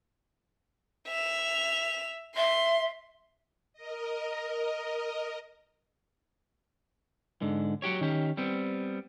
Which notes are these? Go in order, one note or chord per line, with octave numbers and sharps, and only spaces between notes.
E5 F7
E5 C6
A#4 D#5
G#2 D3
F#3 F#4 G4 C#5
D#3 C#4 G4
G3 B3 C4